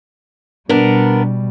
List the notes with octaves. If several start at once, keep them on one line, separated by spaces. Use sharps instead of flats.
B2 G3 B3 D4 A#4